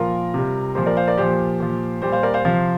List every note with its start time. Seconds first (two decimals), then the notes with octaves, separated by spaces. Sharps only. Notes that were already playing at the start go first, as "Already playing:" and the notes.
Already playing: A#2 F3 F4 A#4
0.34 C3 G3
0.75 A#2 F3 G4 C5
0.86 A#4 D5
0.97 C5 F5
1.07 A#4 D5
1.18 A#2 F3 G4 C5
1.60 A#2 F3
2.02 A#2 G3 G4 C5
2.12 C5 F5
2.23 A#4 D5
2.34 C5 F5
2.45 C3 F3 C5 F5